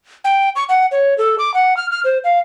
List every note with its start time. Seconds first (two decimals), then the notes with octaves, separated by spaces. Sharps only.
0.24 G5
0.56 C#6
0.69 F#5
0.92 C#5
1.18 A4
1.39 D6
1.54 F#5
1.77 F6
1.91 F6
2.04 C5
2.24 F5